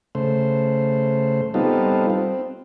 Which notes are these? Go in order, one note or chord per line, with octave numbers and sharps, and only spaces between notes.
C#3 A3 C5
G3 B3 C4 D#4 F4 A4
C4